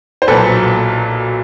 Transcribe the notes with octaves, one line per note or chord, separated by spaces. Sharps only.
C5
B1 A#2 F#3 A4 B4